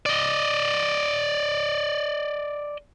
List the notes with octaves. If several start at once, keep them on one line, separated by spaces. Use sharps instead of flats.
D5 D#5